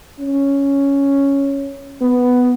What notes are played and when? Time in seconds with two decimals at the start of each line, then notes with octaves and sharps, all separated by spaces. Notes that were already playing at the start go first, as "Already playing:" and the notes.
0.20 C#4
2.01 B3